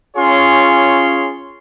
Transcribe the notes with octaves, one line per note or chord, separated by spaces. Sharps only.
C#4 F4 G#4 C#5 C6